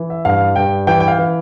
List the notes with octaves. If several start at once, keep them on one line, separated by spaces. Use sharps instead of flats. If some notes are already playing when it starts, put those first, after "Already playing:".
Already playing: E3
E5
G2 F5
G2 G5
E3 G5
G5
F5
E3